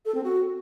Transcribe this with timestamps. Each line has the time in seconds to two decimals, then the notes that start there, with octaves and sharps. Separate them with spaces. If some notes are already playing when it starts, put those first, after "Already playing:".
0.06 A4
0.15 C4
0.24 F#4